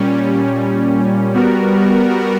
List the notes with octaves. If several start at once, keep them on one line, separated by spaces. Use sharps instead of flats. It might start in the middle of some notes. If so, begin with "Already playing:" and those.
Already playing: A#2 G3 C#4
G3 B3 F#4 A#4